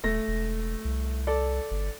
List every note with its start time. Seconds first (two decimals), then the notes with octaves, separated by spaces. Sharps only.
0.04 D#1 A3 A#6
0.28 E1
0.85 C2
1.27 A4 D5
1.71 G1